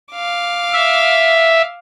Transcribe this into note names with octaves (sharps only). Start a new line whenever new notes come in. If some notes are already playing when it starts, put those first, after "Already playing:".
F5 D6
E5